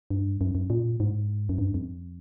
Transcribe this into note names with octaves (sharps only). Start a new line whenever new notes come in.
G2
F#2
F#2
A#2
G#2
F#2
G2
F2